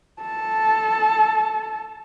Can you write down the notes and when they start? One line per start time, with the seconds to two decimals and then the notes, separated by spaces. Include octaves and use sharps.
0.22 A4 A5